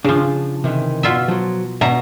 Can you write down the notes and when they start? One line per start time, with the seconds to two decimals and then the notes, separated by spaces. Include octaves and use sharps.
0.05 C#3 F3 D4 F4
0.64 C3 D#3 E3
1.03 B2 F4 E5
1.28 F3 F#3
1.81 B2 E5 A#5